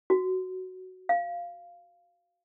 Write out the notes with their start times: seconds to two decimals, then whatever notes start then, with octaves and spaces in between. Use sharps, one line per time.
0.10 F#4
1.09 F5